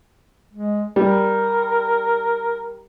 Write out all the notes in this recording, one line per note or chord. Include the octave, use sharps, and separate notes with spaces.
G#3
G3 A#4